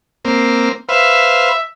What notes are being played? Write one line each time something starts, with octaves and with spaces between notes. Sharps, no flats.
A#3 C4
B4 C5 E5 F5